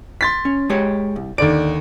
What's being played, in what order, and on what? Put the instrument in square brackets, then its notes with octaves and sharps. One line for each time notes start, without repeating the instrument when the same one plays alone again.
[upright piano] C6 A6 B6
[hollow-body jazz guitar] C#4
G#3 G4 C#5
C2
[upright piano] D#2 D3 D7 [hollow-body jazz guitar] D5